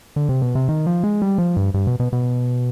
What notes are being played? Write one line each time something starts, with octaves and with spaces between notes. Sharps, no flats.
D3
C3
B2
C3
D#3
F3
G#3
G3
F3
G2
G2
B2
B2
B2